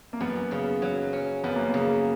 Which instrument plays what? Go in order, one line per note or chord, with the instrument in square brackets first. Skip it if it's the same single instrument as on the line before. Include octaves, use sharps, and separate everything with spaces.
[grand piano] A#3
[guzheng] F#2 [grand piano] B3
[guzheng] C#3
F#3
C#4
[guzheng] F#2 [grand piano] B3
[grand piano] A#3
B3
[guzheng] C#3